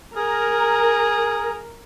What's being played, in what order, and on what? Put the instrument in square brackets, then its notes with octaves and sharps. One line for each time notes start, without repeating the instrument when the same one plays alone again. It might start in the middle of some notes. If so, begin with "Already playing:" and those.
[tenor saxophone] G#4 [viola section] A#4